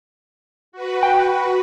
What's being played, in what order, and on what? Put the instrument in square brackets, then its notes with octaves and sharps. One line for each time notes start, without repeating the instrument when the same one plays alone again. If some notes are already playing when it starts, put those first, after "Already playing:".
[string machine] F#4 B4
[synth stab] G5